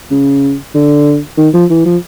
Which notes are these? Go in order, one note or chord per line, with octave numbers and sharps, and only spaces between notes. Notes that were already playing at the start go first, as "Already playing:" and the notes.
C#3
D3
D#3
F3
E3
F3